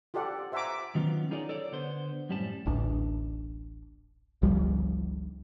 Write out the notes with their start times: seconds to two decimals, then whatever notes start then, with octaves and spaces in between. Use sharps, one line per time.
0.14 F4 G4 A4 D5 F#5
0.52 C5 E5 F#5 G#5 A#5 D6
0.95 D#3 F#3 B3 C#4 F4
1.31 D#4 F4 G#4 A#4 C#5 D5
1.49 A4 C#5 D5
1.72 D3 B3 C5
2.29 F#2 A2 G3 C#4 A5
2.66 D1 A1 D4
4.42 G1 C#2 F3 G3